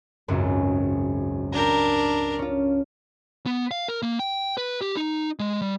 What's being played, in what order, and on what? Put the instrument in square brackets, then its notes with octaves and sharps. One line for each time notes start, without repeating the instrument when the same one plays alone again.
[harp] G#1 C#2 F#2
[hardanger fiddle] D4 A#4 [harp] G5 A#5
[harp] C#4 F4
[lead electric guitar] B3
F5
A#4
A#3
G5
B4
G4
D#4
G#3
G3